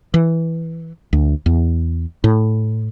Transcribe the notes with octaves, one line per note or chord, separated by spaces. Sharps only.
E3
D2
E2
A2